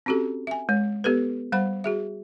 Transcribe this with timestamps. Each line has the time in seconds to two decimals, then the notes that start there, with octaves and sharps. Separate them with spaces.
0.06 C4 C#4 F#4 G4 A4
0.47 E5 G#5
0.69 G#3 C#5
1.04 B3 G4 A4 B4
1.52 G3 C5 F#5 B5
1.84 F#4 G#4 E5